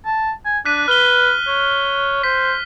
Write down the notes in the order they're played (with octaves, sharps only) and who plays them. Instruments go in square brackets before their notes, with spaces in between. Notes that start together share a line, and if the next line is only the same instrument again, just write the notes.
[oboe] A5
G#5
[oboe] D4 [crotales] F#6 B6 D#7
[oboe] B4 [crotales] F6 F#6 G7
[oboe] C#5
[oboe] C5 [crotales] B6